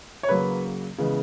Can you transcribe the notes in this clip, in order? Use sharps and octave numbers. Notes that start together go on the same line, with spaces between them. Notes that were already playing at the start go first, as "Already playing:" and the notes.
C#5
C#3 F#3 A#3 B4
C#3 E3 G#3 B3